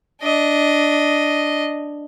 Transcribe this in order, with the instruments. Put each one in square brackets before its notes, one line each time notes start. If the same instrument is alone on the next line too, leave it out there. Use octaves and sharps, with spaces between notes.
[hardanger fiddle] D4 D#5